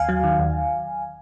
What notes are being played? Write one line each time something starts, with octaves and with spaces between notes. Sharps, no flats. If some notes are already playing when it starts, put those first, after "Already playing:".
Already playing: D#2 F5 G#5
F#3
D#3
D#2